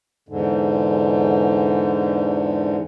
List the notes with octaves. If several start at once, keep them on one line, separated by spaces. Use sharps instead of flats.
E2 G#2 D3